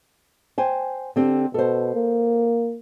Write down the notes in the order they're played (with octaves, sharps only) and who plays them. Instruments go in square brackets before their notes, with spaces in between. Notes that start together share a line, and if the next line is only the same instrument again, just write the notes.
[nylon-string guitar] C5 G5 G#5
D3 C4 G4
[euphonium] B2 [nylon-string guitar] A4 C5
[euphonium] A#3